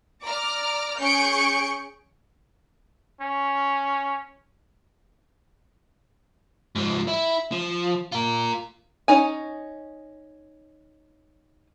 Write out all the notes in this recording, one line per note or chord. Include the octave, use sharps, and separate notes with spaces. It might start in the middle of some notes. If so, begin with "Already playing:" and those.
D5 A#5 D6 F6
C#4 G#4 C#6 G6 C#7 D7
C#4
G#2 F3
E4
F3
F4 A#4
C#4 D#4 G#5